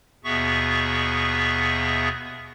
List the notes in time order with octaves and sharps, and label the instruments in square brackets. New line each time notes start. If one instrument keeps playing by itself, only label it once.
[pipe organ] D#2 B2 B3 G#4 E5 C#6